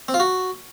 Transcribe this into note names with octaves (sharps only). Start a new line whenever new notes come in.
C4
F4
F#4